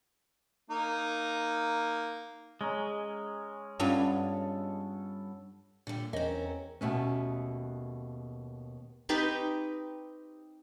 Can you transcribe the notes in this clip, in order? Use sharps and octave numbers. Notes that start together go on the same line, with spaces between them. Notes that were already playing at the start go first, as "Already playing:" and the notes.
A#3 D#4
G#3 C#4 C#5 A#5
G2 B3 C#4 F4 A4
A#2 D3 G3
E2 C4 C#4 A#4 D#5
D#2 B2 A3 C#4
C4 D#4 G4 B4